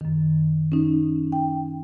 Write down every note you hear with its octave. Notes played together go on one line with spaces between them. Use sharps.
F#2 D#3
C#4 D#4
G5